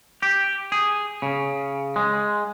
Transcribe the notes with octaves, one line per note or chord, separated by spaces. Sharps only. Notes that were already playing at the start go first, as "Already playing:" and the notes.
G4
G#4
C#3
G#3